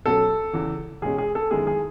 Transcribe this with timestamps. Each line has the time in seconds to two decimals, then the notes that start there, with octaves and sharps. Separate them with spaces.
0.06 B2 F#3 C#4 A4
0.53 E2 C#3 E3
1.02 E2 B2 G#3 C#4 G#4
1.18 G#4
1.35 A4
1.51 F#2 D#3 G#3 B3 E4 G#4
1.67 G#4